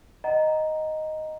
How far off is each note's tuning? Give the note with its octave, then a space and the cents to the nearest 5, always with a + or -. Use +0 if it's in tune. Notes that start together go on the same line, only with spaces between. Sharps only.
D#5 +0 F#5 +25 A#5 +0